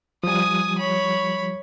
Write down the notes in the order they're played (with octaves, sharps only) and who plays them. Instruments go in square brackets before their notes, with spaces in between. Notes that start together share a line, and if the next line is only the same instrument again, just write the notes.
[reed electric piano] F3 G3 [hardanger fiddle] G#5 D#6
[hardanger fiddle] C#5 B5